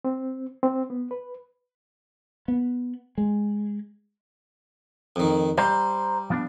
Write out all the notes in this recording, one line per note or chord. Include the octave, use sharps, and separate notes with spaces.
C4
C4
B3
B4
B3
G#3
F2 D#3
G3 C5 A#5 C6
F3 B3 D4